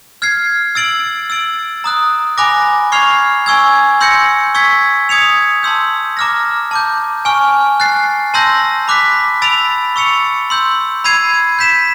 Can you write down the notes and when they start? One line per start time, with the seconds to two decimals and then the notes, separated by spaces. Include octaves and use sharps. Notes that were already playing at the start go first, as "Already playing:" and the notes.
0.22 F6 G#6 C7
0.75 E6 A6 D7 F#7
1.30 E6 A6 D7 F#7
1.84 A#5 D#6 F#6
2.38 G#5 B5 D6 F#6 A#6
2.92 C#6 F6 G#6 C7 F7
3.46 G#5 C#6 E6 G#6
4.00 C6 E6 G6 A#6 C#7
4.55 C#6 E6 G#6 B6
5.09 D#6 G#6 C#7 F7
5.63 A5 C6 E6 G6
6.17 A#5 D6 F6 A#6
6.71 A5 D6 G6
7.25 G#5 C#6 F6
7.80 F#6 A6 C7
8.34 A5 C6 E6 G6 A#6
8.88 B5 D6 F#6 B6
9.42 B5 E6 A6 D7 F7
9.96 C#6 E6 A6 C#7 F7
10.50 C6 E6 G6
11.04 B5 E6 G#6 C7 D#7
11.59 G6 B6 E7